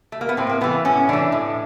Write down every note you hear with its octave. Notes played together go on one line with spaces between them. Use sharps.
A3
A#3
B3
A2 C4
A#3
E3 A3 B3
A2 C#4
E3 A3 D4
A2